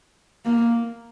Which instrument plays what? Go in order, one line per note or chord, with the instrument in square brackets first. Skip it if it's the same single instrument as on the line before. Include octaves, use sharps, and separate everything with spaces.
[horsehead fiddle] A#3